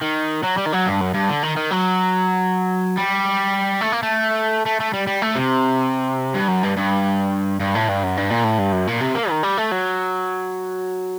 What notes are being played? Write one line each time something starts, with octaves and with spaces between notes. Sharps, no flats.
D#3
F#3
G3
D#3
F#3
G2
F#2
G2
D3
D#3
D#3
F#3
G3
A3
A#3
A3
A3
A3
G3
G3
A3
C3
G2
F#2
G2
G2
G2
A2
G2
F#2
G2
A#2
A2
G2
F#2
A#2
C3
A#3
D#3
G3
A3
F#3